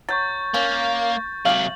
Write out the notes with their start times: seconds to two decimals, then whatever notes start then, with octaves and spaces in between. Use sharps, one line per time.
0.09 F#3 C#6 G6 A6
0.54 A#3 C#4
1.45 C3 F#3 G4 F5 F#7